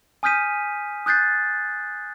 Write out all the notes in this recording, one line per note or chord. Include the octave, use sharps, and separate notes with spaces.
G#5 D#6 F6 G6 B6 D#7
D#6 F#6 G6 A6 C7